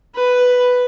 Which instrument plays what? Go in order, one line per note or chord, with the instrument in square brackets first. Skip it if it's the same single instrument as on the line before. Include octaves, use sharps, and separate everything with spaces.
[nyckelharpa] B4